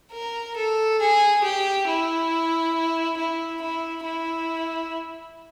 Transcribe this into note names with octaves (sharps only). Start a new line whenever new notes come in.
A#4
A4
G#4
G4
E4
E4
E4
E4